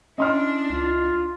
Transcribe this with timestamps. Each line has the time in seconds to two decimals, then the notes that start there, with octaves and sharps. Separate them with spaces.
0.18 C#4 D4 E4 D#5 C6 F6
0.70 C#2 F4